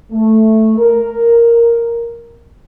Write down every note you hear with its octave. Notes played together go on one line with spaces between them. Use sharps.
A3
A#4